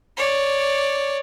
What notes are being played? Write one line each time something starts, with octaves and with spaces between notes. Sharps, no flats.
C#5 D5